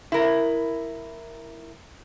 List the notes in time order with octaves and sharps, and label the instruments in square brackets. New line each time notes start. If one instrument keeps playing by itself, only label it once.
[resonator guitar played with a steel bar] E4 A#4